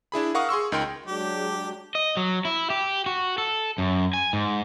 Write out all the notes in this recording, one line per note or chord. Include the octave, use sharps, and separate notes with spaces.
D4 E4 G#4 B5
A#4 F5 F#5 C#6 D#6
G#4 C6 C#6 E6
C#2 D#4 A#4 G5 C6
F#3 G#3 D4 G4
D#5
F#3
E4
G4
F#4
A4
F#2
G#5
G#2